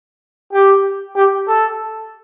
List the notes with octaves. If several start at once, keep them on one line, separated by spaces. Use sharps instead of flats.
G4
G4
A4